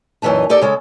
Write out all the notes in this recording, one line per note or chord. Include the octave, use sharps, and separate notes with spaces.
F#2 A#2 E3 D#4 A5
D#4 G4 A4 D5
C#3 G#3 A4